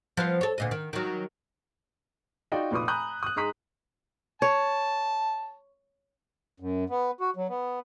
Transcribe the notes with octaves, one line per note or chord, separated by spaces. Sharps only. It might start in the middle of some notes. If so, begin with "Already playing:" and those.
F3 B3 F4
A4 C#5
D2 A#2 D#5
D#3
D#3 F#3
D#4 F4 F#4 D5 G5
F1 A#2 B4 D6 D#6
G#5 A#5 B5 D#6 F#6 G6
D#6 F#6
G#2 G#3 A#5 D#6 B6
C#5 A5
F#2
B3
F#4
F#3
B3